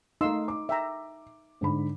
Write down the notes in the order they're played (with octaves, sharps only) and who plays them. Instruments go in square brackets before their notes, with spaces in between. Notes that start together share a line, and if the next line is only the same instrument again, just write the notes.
[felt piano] A3 F5 [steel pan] D#4 C6 E6
[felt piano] D6
[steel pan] E5 G5 A#5
[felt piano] G#2 D3 B5